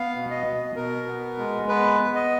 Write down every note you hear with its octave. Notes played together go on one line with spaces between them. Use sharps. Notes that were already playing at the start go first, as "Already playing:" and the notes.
Already playing: B3 F5
B2
D#5
B2
B2 A#4
B3
G#3
B3 B4
B3
D#5